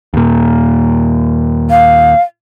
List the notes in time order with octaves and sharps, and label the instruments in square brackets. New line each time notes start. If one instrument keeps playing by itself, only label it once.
[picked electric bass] D#2 A#2
[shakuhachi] F5